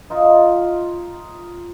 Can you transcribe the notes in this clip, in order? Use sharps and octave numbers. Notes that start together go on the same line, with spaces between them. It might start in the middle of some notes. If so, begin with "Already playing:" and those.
D#4 F4 D#5 E5